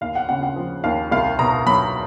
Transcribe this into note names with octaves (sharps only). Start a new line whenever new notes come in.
D#2 F5
F#5
C#3 F#5
F#5
F3
D#2 F5
C2 F5
B2 A#5
F#3 B5